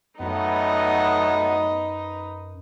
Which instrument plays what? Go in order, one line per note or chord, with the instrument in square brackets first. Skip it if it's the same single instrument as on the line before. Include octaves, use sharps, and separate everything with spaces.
[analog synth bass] F#2 [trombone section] A2 F#3 B3 [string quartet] D#4 B4 D#5